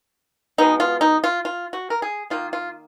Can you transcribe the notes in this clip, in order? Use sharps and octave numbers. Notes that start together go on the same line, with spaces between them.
B2 G#3 B3 D#4
F4
D#4
F4
F4
F#4
A#4
G#4
D#3 A#3 F4
F4